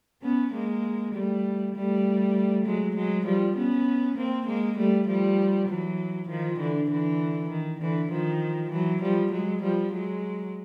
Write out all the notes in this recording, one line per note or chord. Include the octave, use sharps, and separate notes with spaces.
B3 C#4
G#3 A#3
G3 A3
G3 A3
F#3 G#3
F#3 G#3
F3 G3
B3 C#4
A#3 C4
G#3 A#3
G3 A3
F3 G3
E3 F#3
D#3 F3
D3 E3
D3 E3
D#3
D3 E3
D#3 F3
E3 F#3
F3 G3
F#3 G#3
F3 G3
F#3 G#3